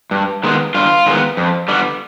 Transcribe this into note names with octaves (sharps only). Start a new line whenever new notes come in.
G2
D#3 G#3 B3
G2 F4
D#3 G#3 B3
F2
D3 G3 B3